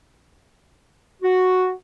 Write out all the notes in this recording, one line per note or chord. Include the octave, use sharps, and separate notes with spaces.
F#4